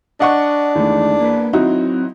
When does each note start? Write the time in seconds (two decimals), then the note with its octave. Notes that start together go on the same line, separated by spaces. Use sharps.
0.20 D4 D#5 F#5 C#6
0.75 E2 G#2 D#3 A3
1.20 A#3 B3 B4
1.53 F#3 C4 D#4 E4 F#4